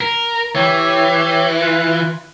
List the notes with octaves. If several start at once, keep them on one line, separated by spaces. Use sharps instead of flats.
A#4
E3 G4 C#5
F4 B4